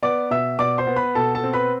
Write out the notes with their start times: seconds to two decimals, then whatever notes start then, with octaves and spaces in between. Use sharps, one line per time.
0.02 B3 D5 D6
0.31 B2 E5 E6
0.59 B2 D5 D6
0.78 C5 C6
0.87 B3
0.96 B4 B5
1.15 B2 A4 A5
1.35 A4 A5
1.44 C4
1.53 B4 B5